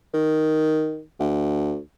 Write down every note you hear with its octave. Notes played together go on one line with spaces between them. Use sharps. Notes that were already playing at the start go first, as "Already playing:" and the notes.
D#3
D2